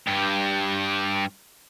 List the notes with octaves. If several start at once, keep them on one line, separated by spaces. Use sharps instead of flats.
G2 G4